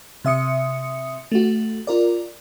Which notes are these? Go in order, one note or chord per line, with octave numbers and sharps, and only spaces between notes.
C3 E5 D#6 C#7
A3 F#4
F4 A#4 D5